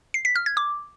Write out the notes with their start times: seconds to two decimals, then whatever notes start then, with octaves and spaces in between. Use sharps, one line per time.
0.14 C7
0.25 B6
0.36 F6
0.46 G#6
0.57 D6